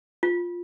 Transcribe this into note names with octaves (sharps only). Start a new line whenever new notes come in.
F4